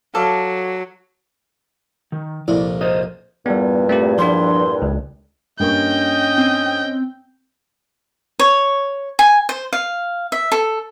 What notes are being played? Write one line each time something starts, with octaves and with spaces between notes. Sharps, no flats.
F#3 A4 D5 F5
D#3
C2 F2 A#2 E4 D5
A#4 C5 D#5 D#6
E2 G2 A#2 G3 B3
A3 C4 G4
F3 D4 C6
C#2
G2 A#3 C#4 D#5 G5 C#6
C4
C#5
G#5
C5
F5
E5
A4